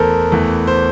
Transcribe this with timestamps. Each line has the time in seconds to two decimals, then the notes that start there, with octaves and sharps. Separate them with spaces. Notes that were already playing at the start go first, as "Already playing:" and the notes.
Already playing: E2 E3 A3 A4 A#4 C5
0.32 E2 E3 A3
0.67 C5